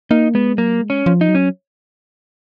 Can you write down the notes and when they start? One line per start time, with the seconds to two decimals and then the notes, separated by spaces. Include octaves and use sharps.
0.11 A#3 D#4
0.34 G#3 B3
0.58 F#3 A#3
0.82 G#3
0.90 C#4
1.06 F3
1.21 D#4
1.29 F#3
1.35 C#4